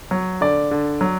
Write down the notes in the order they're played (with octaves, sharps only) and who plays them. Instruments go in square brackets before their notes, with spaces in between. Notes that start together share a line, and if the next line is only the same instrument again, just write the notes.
[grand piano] F#3
D3 D5
D3
F#3